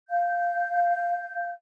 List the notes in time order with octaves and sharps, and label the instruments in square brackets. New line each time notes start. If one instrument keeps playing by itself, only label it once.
[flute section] F5 G6